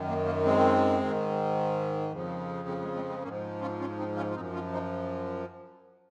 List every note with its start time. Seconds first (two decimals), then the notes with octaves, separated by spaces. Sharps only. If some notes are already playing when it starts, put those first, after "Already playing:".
Already playing: F#2 D#3
0.08 A#3
0.25 A#3
0.45 G#3 C4
1.01 G#2 D#3
2.12 F2 C#3 F3
2.68 G#3 C4
2.82 G#3
2.96 G#3 C4
3.09 G#3 C4
3.23 G#2 F3 A#3 C#4
3.61 C#4 F4
3.80 C#4 F4
3.98 C4 D#4
4.16 C#4 F4
4.30 F4
4.35 F#2 F3 C4 D#4
4.53 C#4 F4
4.73 C4 D#4